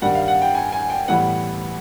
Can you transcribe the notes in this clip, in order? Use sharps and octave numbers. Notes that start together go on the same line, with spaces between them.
G2 D#3 G3 F#5
F5
F#5
G5
G#5
G#5
G5
A2 E3 G3 B3 F#5